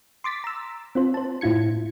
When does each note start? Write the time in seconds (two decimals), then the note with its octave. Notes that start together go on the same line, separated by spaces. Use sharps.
0.24 C6 D6 A6 B6
0.44 A#5 E6
0.95 C4 F4 C5
1.14 C5 A5
1.41 A2 E4 F4 G#6 C#7